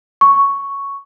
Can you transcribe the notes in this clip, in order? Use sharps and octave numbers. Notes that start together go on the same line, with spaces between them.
C#6